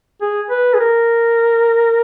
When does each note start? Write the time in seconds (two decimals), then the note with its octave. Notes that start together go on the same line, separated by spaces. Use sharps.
0.21 G#4
0.51 B4
0.74 G#4
0.80 A#4